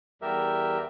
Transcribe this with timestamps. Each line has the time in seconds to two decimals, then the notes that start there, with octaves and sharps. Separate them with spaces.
0.22 E2 G3 G4 A#4 E5